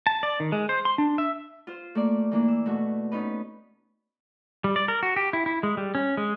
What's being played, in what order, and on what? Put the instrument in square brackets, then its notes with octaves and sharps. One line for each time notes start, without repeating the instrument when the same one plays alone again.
[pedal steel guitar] A5
D5
D#3
G#3
C5
C6
D4
E5
[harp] F4 C5
A3 A#3 D5
E3 A#3 D4
E6
B2 A3 F#4
B3 C#4 D#4 B4
[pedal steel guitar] G3
D5
A#4
F#4
G4
E4
E4
G#3
G3
C#4
G#3